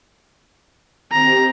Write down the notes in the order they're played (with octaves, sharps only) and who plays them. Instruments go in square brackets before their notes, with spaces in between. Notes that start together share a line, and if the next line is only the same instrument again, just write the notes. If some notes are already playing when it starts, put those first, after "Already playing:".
[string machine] D#3 C4 G4 [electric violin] A#5